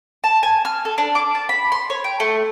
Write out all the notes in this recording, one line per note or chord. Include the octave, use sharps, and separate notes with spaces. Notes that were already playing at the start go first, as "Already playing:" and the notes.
A5
G#5
F6
A4
D4
D6
A5
B5
C6
C#5
G5
A3